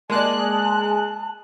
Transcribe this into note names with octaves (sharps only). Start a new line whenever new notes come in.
G#3 A#3 D5 A5 F#6